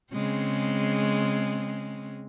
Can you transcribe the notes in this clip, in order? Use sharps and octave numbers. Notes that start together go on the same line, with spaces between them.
C#3 G#3 C4